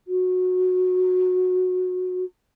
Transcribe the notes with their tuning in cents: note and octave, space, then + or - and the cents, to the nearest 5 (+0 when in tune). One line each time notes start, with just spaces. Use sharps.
F#4 -15